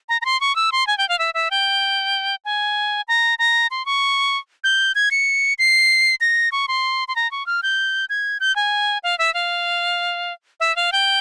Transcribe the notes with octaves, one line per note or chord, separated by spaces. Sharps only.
A#5
A#5
C6
C#6
E6
C6
G#5
G5
F5
E5
E5
G5
G#5
A#5
A#5
C6
C#6
G6
G#6
C#7
C7
A#6
C#6
C6
C6
A#5
C#6
F6
G6
G#6
G6
G#5
F5
E5
F5
E5
F5
G5